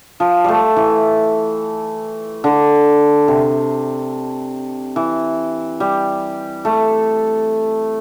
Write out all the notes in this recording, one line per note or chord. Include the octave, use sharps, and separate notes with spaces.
F3
G3 A3
E3
D3
C3
E3
G3
A3